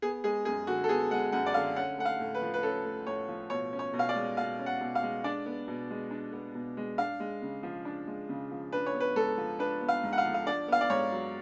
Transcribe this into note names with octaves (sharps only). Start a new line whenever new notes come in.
B3 G#4
G#3 G#4
F#2 G#4
D3 F#4
A4
B3 G#4
G#3 F#5
F#2 F#5
D5
D3 F5
C#4 F#5
A3 F#5
F5
A2
B4
F3
B4
C#4 A4
A3
A2 C#5
F3
B2 C#5
C#4
C#5
B2
F5
D5
G#3
B2 F5
C#4
F#5
B2
F5
G#3
D4 D5
B3
B2
G#3
D4
B3
B2
G#3
D4 F5
G#3
C#3
F3
D4
G#3
C#3
F3
D4 B4
C#5
B3
B4
G#2 A4
F3
D4 B4
B3
F5
G#2
F#5
F5
F3
F5
D4 D5
B3 F5
D5
G#2 C#5
F#3